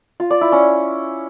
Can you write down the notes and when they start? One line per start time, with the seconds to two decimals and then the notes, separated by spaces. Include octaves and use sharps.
0.20 F4
0.31 D5
0.41 E4
0.52 C#4